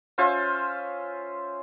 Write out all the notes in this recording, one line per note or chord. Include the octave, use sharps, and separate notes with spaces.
C#4 F4 C5 E5